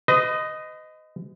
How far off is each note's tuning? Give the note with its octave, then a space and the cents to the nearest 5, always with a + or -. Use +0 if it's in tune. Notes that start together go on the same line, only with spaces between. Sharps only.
B4 +45 D#5 +0